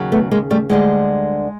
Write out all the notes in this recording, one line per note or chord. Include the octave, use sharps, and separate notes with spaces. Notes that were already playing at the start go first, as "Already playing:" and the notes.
Already playing: D#2 C#3 F#3
A3 B3
G#3 A#3
G3 A3
D2 D3 G3 G#3